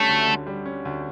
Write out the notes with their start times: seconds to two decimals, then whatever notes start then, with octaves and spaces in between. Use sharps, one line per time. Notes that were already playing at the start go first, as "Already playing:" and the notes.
Already playing: D3 G3 A3 C#4
0.09 D2
0.28 D3
0.47 G3
0.66 C#4
0.85 D2